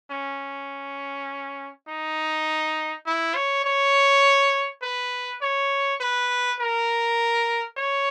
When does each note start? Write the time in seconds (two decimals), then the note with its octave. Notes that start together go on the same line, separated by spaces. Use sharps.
0.11 C#4
1.88 D#4
3.06 E4
3.35 C#5
3.65 C#5
4.83 B4
5.42 C#5
6.01 B4
6.60 A#4
7.77 C#5